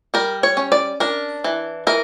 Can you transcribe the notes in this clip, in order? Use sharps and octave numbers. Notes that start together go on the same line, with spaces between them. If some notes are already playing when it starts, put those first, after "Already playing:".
G3 A#4
C#5
C#4
D5
D4 A#4
E3
E3 A#4